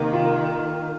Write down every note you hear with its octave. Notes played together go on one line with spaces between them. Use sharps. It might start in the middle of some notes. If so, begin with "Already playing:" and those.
Already playing: C3 D#3 A#3
F4